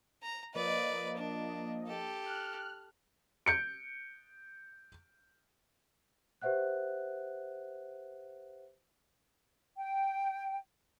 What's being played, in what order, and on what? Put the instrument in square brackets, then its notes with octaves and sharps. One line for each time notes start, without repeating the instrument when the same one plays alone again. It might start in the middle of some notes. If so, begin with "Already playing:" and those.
[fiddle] A#5
[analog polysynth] F3 A#3 D#5 [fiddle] B4 D5
[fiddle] D4
G4 A4
[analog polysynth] F6 F#6
[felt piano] G6 C#7 D7
[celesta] G4 B4 C5 E5 F#5 F#6
[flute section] G5